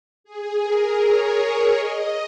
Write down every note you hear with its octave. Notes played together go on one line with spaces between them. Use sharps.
G#4
A#4
C#5
D#5